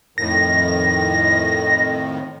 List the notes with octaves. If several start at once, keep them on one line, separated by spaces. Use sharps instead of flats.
F2 A2 D#3 A#6